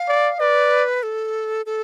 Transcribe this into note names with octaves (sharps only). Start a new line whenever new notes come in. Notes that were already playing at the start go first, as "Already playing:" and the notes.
Already playing: F5
D5
B4 D5
A4
A4